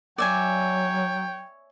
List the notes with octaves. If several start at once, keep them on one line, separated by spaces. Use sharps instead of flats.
F#3 C#5 D5 E5 G5 G#5